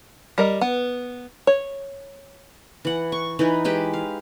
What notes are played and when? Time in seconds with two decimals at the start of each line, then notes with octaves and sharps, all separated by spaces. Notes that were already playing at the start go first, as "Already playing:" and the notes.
0.38 G3 A#4 D#5
0.61 B3
1.47 C#5
2.85 E3 F#5
3.12 C#6
3.39 E3 D#4 B4
3.65 G#3 G4 B4 G5
3.94 F5